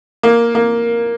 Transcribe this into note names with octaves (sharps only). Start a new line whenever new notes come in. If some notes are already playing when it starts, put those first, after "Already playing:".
A#3
A#3